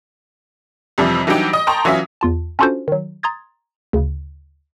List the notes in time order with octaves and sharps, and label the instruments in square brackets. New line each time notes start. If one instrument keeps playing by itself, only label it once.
[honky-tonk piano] F2 C3 E3 F3 G3
E3 F#3 G3 D4 D#4 G4
D#5 D#6
G5 A5 A#5 C6 C#6
E3 F#3 C#4 F4 E5
[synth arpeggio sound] E2 F4 A5
C#4 D4 F4 F#4 A4 C5
D#3 F#3
A#5 C6 D#6 G#6 A6
D2 C#3